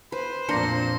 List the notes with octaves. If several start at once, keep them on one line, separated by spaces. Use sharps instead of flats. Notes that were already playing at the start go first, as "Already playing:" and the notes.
B4 C5
F2 A#2 A#3 D4 C6 A#6 C#7